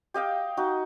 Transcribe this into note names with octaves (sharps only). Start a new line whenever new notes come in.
G4 D#5 F5 G5
D#4 F#4